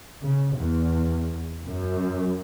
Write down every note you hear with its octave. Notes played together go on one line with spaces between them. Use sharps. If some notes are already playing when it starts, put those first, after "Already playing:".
C#3
E2
F#2